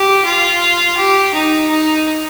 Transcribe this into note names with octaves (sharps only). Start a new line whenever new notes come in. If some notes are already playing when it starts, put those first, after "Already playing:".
Already playing: G4
F4
G4
D#4
D#4